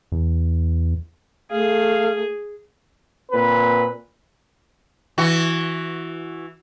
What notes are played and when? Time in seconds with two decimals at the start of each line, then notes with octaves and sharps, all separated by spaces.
0.12 E2
1.51 A3 G#4 F5
3.31 A#2 C4 B4
5.18 E3 F#4